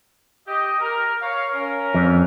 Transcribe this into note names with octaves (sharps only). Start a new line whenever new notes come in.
G4 D#5
A#4
C#5 F5
C#4 A#4
F2